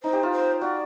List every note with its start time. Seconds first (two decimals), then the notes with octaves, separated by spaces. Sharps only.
0.03 D#4 C5
0.13 G4
0.23 F4
0.32 C5
0.61 F#4 D5